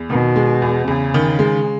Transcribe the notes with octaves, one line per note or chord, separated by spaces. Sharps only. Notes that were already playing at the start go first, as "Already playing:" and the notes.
Already playing: E2
B2 D#3
G#3
E2
E2 C#3
D#3
G#3